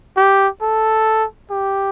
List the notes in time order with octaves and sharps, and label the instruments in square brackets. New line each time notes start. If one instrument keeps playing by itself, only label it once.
[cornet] G4
A4
G4